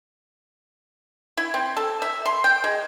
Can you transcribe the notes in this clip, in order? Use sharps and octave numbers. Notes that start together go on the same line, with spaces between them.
E4
C4
A4
E5
C6
G5
G#3